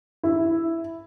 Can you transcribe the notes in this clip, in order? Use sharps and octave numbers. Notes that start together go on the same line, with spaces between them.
E4